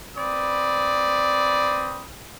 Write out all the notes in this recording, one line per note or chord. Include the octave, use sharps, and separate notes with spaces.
C4 B4 D5 B5 D#6